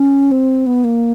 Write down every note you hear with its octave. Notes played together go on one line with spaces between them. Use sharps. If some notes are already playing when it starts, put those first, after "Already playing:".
Already playing: C#4
C4
B3
A#3